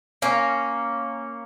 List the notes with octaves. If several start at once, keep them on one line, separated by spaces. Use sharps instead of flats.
A#3 C#4